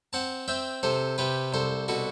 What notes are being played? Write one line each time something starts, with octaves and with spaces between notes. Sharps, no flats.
C4 F#5 A5
C4 E5 G5
C3 A4 C5
C3 G4 B4
C2 A4 C5
B2 F#4 A4